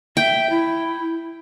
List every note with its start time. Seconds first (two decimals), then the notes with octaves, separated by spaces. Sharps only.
0.17 E5 G5
0.49 E4